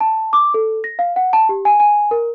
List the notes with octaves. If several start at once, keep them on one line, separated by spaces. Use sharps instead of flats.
A5
D6
A4
A#6
F5
F#5
A5
G4
G#5
G#5
A#4